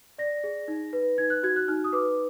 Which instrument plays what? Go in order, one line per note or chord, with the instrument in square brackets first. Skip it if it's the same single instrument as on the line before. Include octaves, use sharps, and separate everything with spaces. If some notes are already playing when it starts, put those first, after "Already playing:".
[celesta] D5 A#6
G#4
D#4
B4
D#4 G#6
F#6
F#4 G#6
F#6
D#4 F6
D#6
B4 D6